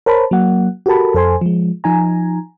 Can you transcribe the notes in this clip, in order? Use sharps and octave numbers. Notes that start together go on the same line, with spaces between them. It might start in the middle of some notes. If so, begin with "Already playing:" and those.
A#4 C5 C#5 A5 B5
F#3 A#3 F#5
F#4 G4 A4 A#4 A5 B5
F2 A4 C5 G#5 C6
F3 G#3
F3 D#4 G#5 A#5